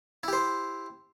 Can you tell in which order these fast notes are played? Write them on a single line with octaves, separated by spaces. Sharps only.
E4 G4 C5